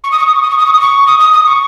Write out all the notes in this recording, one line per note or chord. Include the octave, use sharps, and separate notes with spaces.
C#6
D#6
C#6
D#6
C#6
D#6
C#6
D#6
C#6
D#6
C#6
D#6
D#6
D#6
C#6